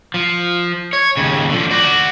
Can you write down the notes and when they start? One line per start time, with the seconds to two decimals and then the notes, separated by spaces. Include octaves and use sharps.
0.14 F3
0.93 C#5
1.17 D#2 C#3
1.49 D3 F3
1.71 F#4 D5